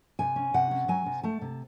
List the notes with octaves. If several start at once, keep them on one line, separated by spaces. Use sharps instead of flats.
C3 G#5
C#4
C3 F#5
C#4
F#3 G#5
C3
A3 A5
C3